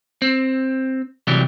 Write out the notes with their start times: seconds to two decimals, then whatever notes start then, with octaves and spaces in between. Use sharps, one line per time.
0.22 C4
1.27 C3 E3 F#3 G3